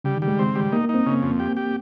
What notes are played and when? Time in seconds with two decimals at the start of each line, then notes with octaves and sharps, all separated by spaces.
0.04 C#3 G3
0.16 D#3
0.22 G3
0.28 G#3
0.39 C4
0.55 G3
0.72 A#3 D#4
0.84 A#3
0.89 D#4
0.94 C4
1.06 C#3
1.22 F2
1.40 G4
1.57 G4